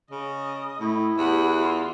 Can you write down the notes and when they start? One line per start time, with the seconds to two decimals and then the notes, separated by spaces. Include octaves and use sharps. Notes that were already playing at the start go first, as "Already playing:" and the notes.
0.11 C#3 D#5
0.80 A2 E4
1.17 E2 G4 F#5
1.60 F4